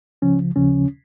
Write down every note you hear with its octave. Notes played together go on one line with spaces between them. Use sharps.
C#2 C#3 F3 C#4
D#2 C#3 F3 C#4